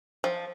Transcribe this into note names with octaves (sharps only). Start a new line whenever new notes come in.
F3